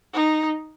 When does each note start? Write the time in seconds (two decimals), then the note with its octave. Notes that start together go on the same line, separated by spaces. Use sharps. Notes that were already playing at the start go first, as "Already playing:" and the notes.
0.13 D#4